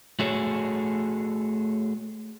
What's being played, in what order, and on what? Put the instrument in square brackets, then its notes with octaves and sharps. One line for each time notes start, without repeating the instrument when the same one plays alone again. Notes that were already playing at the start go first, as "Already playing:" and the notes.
[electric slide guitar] A3 F#4 G#4 A4 C#5